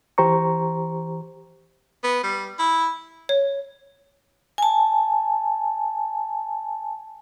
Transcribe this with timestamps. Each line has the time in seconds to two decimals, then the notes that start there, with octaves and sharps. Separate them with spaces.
0.18 E3 G4 C5 A#5 C#6
2.04 B3
2.24 G3
2.59 E4
3.29 C#5
4.58 G#5 A5